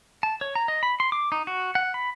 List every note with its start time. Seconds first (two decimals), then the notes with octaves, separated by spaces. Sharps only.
0.23 A5
0.41 C#5
0.55 A#5
0.68 D#5
0.83 B5
1.00 C6
1.12 D6
1.32 D#4
1.47 F#4
1.75 F#5
1.94 B5